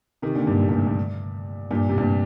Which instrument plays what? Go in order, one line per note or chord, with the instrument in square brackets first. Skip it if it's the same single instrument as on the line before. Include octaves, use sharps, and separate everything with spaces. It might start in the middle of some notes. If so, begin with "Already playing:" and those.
[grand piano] C3 D#3
A#2 D3
G2 A#2
A2 C3
G2 A#2
A2
G2
G2 A#2
A2 C3
G2 A#2